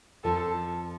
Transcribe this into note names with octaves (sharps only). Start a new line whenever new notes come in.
F2 F3 A4